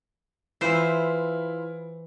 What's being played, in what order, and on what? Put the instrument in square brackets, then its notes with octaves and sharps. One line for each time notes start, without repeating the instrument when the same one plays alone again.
[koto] E3 C5 [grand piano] E4 F4